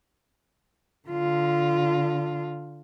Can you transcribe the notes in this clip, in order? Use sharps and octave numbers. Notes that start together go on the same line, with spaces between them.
D3 F4